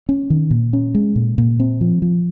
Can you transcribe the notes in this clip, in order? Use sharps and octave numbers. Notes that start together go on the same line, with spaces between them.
C#4
D#3
A#2
C#4
G#3
A#2
A#2
C4
F3
F3